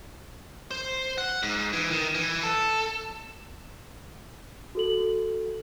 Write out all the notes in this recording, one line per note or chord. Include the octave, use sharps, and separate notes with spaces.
C5
F#5
G#2
E3
D#3
E3
A4
F#4 A4 F#7